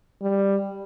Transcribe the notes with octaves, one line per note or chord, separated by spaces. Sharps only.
G3